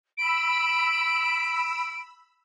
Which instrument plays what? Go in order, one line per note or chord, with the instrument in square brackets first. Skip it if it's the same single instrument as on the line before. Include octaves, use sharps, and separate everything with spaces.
[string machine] B5 E6 [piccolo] D7